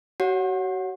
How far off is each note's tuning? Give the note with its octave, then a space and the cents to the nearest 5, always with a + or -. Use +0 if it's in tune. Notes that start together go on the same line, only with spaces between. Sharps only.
F#4 +35 C#5 +0 F#5 -20